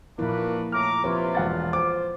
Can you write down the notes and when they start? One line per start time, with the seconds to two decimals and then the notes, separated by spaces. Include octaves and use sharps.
0.19 A#2 F3 A#3 D4 E4 F#4 B4
0.72 A2 A#5 D6 F6
1.04 C3 F3 F4 B4 C#5
1.35 E1 F#5 A6
1.73 C5 D6